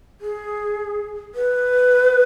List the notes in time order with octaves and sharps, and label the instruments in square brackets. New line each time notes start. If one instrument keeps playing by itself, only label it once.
[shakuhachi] G#4
B4